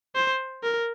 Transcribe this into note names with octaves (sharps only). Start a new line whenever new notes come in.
C5
A#4